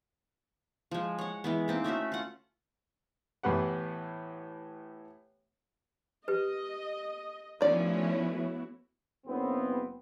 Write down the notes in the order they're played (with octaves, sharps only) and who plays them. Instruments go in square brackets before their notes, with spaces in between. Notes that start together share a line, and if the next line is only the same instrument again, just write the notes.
[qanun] F3 G#3
C#5 F#5
E3 G#3 B3
A#3 C4 D#4
A3 C#4 F#4 E5
F4 F#5
[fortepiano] A2 E3 B3 G4 F#5
[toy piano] G4 B4 [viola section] D#5
[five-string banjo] D#3 D5 [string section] F3 A3 C#4 [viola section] B3 E4 F#4
[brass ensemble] F#1 B3 C4